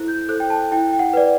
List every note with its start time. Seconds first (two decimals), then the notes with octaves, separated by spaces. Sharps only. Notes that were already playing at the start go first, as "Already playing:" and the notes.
Already playing: E4 A4 C5 F#6
0.08 G6
0.29 A4 C5 F#6
0.40 G5
0.50 A5
0.71 E4 G5
0.93 G5
0.99 F#5
1.13 B4 D5